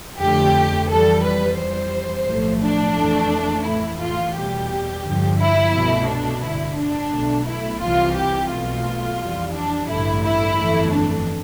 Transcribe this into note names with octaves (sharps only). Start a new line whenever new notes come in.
F2 D3 A3 G4
F2 E3 G3 A4
B4
F2 E3 G3 C5
B1 A2 F3 A3
D4
F2 E3 A3
A1 A2 E3 A3 E4
F4
E2 B2 G3 G4
G2 D3 F3
E4
C2 B2 A3
D4
A1 G2 D3 E4
D4
B1 B2 A3
E4
C2 C3 E3 F4
G4
B1 B2 A3 F4
F2 E3 G3
D4
A1 G2 D3 A3 E4
E4
G1 F2 E3 A3
D4